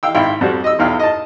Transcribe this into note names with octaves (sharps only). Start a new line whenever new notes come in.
F5 G5 E6
G#1 E4 F5 G5
F2 G3 F#4 C5
D#5 E6
B1 E2 F5 G5 F6
D#5 A5